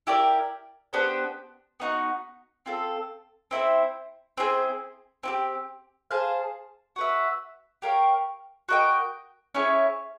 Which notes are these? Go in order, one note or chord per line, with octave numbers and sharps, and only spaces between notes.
E4 G4 A#4 D5
B3 D4 G4 C5
B3 D#4 F#4
C4 F4 A4
C4 E4 A4 C5
C4 E4 G#4 C5
C4 E4 G4
G#4 C5 F5 A5
F#4 B4 E5
G4 A#4 C#5 F5
F#4 A#4 D#5 G5
C#4 E4 G#4 C#5